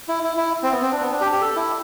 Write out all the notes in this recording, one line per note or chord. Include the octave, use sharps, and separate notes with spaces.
E4
E4
E4
C4
B3
C4
D4
B3
D4
G4
G4
A4
E4